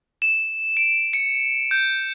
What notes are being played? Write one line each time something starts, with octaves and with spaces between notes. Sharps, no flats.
E7
D7
C#7
G6